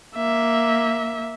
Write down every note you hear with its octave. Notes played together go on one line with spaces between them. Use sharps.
A#3 E5